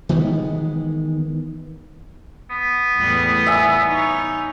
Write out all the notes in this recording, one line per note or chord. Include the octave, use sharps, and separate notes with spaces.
D#3 E3 G#3 B3
B3
E2 A2 G3
E5 G#5
D#4 C#5